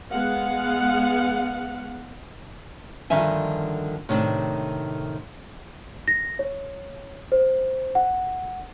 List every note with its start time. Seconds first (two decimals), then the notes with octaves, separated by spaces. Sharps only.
0.11 G#3 B3 F5 F#5
3.10 G2 D3 D#3 F3 E5 G#5
4.09 A2 C3 D#3 D4
6.08 A#6
6.39 C#5
7.32 C5
7.95 F#5